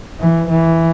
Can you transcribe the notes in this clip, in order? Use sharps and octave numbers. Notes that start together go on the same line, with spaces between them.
E3
E3